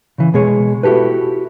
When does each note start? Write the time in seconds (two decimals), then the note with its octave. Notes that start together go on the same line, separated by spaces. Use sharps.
0.18 C#3 E3
0.34 B2 G#3 G#4 C#5
0.83 E4 F#4 G4 A4 B4